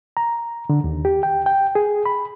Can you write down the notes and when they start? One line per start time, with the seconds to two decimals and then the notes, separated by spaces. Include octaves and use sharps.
0.17 A#5
0.70 D3
0.84 D#2
1.05 G4
1.23 G5
1.46 G5
1.75 G#4
2.06 B5